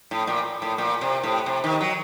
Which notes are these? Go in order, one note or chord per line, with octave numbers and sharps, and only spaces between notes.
A2
A#2
A2
A#2
C3
A2
C3
D#3
F#3